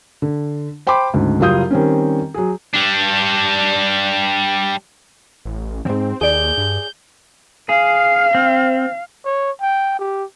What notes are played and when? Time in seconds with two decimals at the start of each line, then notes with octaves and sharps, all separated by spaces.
0.22 D3
0.87 C5 G5 B5 C6 D6
1.13 D2 G#2 C#3
1.40 F#1 F#3 G3 F4 D#6 G6
1.71 D#3 G3 C4 C#4
2.34 F#3 G#4
2.74 G3 D4
5.45 A1
5.85 E2 G#2 C4
6.21 D#2 G#4 D5 G6
6.58 G2
7.69 G#4 F5
8.35 C4
9.25 C#5
9.61 G5
9.99 G4